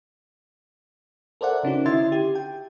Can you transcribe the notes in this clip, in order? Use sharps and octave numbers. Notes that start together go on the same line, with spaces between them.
A4 A#4 C5 D5 E5 F#5
C#3 C#4 D#4 F#4
D3 E4 E5 C6 G#6 A6
G4
G5